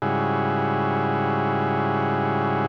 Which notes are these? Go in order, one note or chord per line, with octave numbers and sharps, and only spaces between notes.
G#2 C#3 G3 E4 F#4 G#4